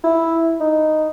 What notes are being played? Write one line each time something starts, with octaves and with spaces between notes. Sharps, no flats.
E4
D#4